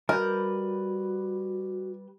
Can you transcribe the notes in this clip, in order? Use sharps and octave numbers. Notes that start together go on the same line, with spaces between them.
G3 F#4 A#4 B4 D#5 G6